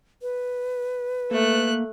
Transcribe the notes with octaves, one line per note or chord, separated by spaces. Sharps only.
B4
A3 A#3 F#6